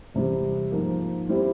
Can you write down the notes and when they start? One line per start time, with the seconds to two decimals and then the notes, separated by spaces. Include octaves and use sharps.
0.14 E2 C3 G3
0.72 G#2 F3 A#3
1.29 G3 C4 E4 G4